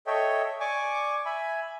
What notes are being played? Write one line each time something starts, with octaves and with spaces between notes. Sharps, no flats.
A4 C#5 D#5 E5 G5
D5 G#5 C#6 D6
E5 G#5 B5